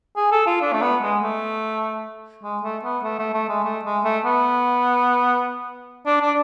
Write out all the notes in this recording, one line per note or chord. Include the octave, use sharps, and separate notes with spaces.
G#4
A4
F4
D4
A3
B3
G#3
A3
G#3
A3
B3
A3
A3
A3
G#3
A3
G#3
A3
B3
D4
D4